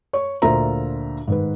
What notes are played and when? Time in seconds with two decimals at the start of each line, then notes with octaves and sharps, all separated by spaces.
0.13 C#5 C#6
0.42 D2 A#2 F4 C5 E5 A#5
1.28 G#2 D#3 B4